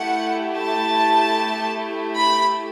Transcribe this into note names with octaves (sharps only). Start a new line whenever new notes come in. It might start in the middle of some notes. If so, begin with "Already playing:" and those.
Already playing: A3 E4 G4 F#5
A5
B5